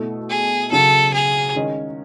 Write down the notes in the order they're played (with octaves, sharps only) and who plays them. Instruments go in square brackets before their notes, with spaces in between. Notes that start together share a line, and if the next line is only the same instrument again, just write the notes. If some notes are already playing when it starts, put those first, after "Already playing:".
Already playing: [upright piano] B2 A3 E4 A4
[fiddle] G#4
[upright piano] C#3 F#3 C#4 [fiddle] A4
[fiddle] G#4
[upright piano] D#3 G#3 C#4